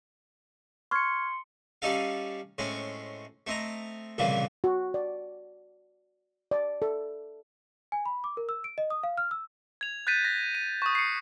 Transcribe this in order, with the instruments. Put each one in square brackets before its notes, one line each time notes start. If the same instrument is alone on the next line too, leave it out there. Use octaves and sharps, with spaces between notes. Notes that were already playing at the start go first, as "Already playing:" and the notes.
[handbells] C6 C#7 [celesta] C#6 F6 G#6
[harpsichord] G3 C#4 D#4 A4 F5
A2 G#3 C4 C#4
A3 C4 D#5 A#5
C2 F2 A#2 C#3 E3 A#3
[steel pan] F#4
D5
D5
A4
[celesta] G#5
B5
D6
A#4
E6
D7
D#5
D#6
F5
F6
E6
[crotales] G#6 F7
F#6 G6 A6 B6 D#7
A#6
D#7
C#6 D#6
C7 C#7